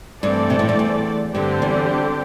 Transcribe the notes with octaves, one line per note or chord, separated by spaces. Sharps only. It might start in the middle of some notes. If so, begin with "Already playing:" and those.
G2 E3 A3 C4 A4 D5
C3
A2
G2
E2
G2 D3 G3 C4 G4 C5
E2